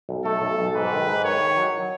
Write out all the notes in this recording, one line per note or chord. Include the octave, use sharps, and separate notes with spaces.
B1
A3 A4
B1
B1
G#2 B4
D#3
G#2
D#3 C#5
D#3
F#3